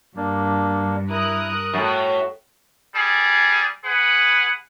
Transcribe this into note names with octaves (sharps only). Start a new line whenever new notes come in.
G2 A#3 D4
E4 A#4 D#6 F#6
F#2 A2 F#4
G3 G#4
G#4 B4 F#5